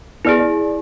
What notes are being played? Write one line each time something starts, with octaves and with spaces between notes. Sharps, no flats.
B3 E4 G#4 D5 F6
D5